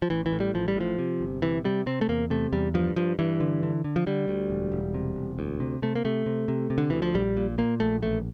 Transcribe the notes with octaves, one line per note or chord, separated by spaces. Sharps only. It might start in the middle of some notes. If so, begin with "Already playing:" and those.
F3
A1 E3
E3
A2
G3
A1 F3
G3
A2 F3
C3
G1
C3 E3
C3 G3
C3 C4
A3
E2 A#3
C3 A3
E2 G3
G2 F3
G2 F3
G2 E3
D3
D3
D3
F3
D3 G3
D2
E1
E1
C3
E1
D2
C3
C3 A3
A#3
C3 A3
C3
C3
C3
D3
D2 E3
F3
A#1 G3
A#2
A#2 A#3
A#1 A3
A1 A3